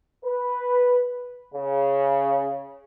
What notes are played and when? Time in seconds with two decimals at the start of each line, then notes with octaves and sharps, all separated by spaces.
0.25 B4
1.54 C#3